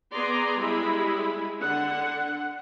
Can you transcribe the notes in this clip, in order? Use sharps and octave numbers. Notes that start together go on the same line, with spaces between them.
B3 G#4 D5 A#5 C6
G3 G#3 E4 G#4 B5
D3 F#5